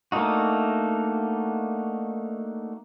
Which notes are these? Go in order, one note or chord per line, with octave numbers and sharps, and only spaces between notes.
A3 A#3 D4 D#4 F#4